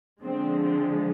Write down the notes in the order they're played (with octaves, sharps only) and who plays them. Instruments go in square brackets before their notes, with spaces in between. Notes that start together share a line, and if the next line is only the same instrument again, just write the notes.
[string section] D3 F3 G#3 C4
C4